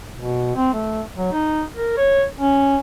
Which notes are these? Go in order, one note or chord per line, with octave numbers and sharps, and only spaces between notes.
B2
C4
A3
F#3
D#4
A#4
C#5
C#4